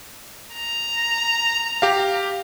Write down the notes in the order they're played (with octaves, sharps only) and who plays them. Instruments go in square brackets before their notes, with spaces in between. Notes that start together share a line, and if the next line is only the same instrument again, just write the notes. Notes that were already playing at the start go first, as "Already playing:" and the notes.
[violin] A#5
[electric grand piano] G4 F5